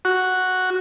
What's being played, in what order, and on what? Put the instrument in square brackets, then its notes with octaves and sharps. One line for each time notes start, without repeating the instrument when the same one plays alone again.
[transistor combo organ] F#4